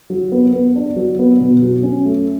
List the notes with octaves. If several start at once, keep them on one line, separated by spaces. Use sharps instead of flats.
F#3
B3
B3
D4
F#3
B3
B2
F#3
C#4
A3